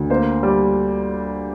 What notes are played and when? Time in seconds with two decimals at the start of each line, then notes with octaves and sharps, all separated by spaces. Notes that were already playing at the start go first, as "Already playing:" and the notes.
Already playing: D2
0.10 A#3 C5
0.43 G3